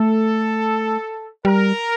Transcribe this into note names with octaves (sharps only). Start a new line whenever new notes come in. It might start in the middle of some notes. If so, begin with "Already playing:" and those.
Already playing: A3 A4
G3 A#4